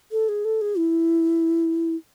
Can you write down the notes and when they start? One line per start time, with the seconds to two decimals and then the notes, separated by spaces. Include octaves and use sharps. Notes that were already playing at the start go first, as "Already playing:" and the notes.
0.12 A4
0.29 G#4
0.45 A4
0.61 G#4
0.78 E4